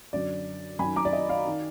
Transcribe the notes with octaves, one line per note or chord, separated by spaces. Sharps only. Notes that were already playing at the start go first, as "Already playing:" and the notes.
F#2 D3 D5
F#2 D#3 G#5 B5
A#5 D6
D5
D#5
D5 F5
D#3